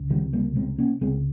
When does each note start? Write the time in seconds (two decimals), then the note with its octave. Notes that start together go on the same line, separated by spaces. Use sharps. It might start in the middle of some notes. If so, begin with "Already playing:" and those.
Already playing: C#2
0.10 C3 D#3 G3
0.33 G3 A#3
0.56 C3 G#3 C4
0.79 A#3 C#4
1.01 C#2 G#3 C4